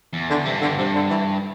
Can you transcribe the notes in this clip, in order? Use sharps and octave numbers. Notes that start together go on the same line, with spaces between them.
E2
D3
G2 C3
D3
G2 C3
D3
E3